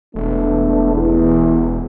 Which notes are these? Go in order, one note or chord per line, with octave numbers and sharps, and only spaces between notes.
E1 A3 B3 D4
E2